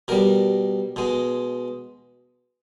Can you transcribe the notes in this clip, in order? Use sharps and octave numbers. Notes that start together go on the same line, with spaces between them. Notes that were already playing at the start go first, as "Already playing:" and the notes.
B2 G3 A#4
B2 G#3